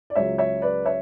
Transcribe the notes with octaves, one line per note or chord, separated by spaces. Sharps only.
D5
C#2 C#3 F#3 C#5 E5
C#5 E5
B4 D5
C#5 E5